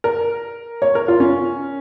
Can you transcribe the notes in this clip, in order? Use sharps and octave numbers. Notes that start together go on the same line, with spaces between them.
A#4
C#5
A#4
F4
C#4